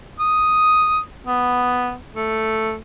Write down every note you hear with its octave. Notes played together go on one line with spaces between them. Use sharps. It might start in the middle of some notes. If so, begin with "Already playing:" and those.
D#6
B3
A3